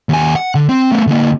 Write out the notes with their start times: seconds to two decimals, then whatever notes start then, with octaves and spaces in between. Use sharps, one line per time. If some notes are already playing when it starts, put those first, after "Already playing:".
0.09 D#2 G#5
0.36 F#5
0.55 D3
0.69 C4
0.92 A3 B3
1.07 D3 A#3